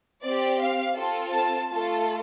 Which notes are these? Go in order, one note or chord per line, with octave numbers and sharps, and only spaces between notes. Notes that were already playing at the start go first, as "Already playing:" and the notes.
C4 G4 D5
F5
C4 F4 A4
A5
A3 F4 A4 A5